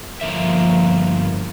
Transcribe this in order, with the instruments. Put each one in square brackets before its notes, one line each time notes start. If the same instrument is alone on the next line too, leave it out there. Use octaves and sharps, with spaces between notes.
[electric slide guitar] G2 D3 E5 [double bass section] F3 A#3